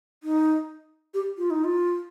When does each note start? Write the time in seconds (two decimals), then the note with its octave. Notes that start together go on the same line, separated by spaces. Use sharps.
0.23 D#4
1.14 G4
1.38 F4
1.51 D#4
1.64 F4